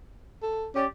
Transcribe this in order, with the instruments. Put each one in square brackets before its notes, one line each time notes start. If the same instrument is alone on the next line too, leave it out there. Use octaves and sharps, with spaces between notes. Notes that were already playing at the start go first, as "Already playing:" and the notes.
[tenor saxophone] A4
[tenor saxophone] C#4 [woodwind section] G4 D5